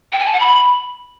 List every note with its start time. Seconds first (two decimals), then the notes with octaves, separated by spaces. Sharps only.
0.12 G5
0.19 G#5
0.26 A5
0.33 F#5
0.40 B5